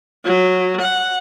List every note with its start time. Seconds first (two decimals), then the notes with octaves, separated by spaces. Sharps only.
0.25 F#3
0.81 F#5